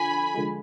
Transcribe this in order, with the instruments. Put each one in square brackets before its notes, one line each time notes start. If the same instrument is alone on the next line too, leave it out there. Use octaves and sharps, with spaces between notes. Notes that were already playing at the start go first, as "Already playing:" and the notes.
Already playing: [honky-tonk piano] D3 F3 [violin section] G#5 B5
[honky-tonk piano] D3 F3 G#3